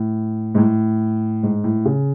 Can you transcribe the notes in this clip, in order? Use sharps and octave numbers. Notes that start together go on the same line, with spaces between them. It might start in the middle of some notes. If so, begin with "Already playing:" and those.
Already playing: A2
G#2
A2
G#2
A2
C#3